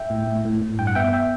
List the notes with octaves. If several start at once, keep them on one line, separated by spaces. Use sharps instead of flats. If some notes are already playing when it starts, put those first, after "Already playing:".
Already playing: E5 G5
A2
A2
A2
A2
G2 G5
F#5
B3 E5 G5
E5 G5